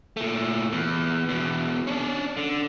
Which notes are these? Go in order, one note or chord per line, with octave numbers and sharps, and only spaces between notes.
A#2 A3
E2
E2 B2
C#4 D4
D3